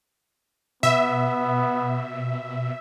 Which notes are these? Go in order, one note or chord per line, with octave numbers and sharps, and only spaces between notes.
B2 B3 E5